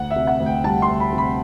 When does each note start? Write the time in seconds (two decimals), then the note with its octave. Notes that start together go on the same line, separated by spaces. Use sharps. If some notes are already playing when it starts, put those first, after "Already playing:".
Already playing: D2 F#5
0.11 E5
0.16 C3
0.27 F#5
0.40 D2
0.46 G5
0.64 G3 A5
0.82 C6
0.88 D2
1.00 B5
1.13 C3
1.18 B5